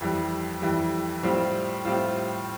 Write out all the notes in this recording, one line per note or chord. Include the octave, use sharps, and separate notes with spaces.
F2 E3 G3
F2 E3 G3
A2 G3 C4 F4
A2 G3 C4 F4